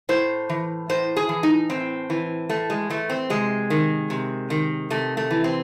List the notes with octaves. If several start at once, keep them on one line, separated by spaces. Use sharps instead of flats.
A2 C5
E3
A2 C5
G#4
E3
D#4
A2 C4
E3
A2 A3
G#3
E3 A3
C4
C3 G#3
D#3
C3
D#3
C3 A3
A3
E3
C4